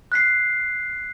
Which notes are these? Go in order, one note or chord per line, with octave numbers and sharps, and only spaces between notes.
F#6 B6 C7